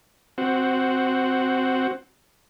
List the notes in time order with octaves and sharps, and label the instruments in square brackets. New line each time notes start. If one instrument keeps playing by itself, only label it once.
[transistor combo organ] C4 F#4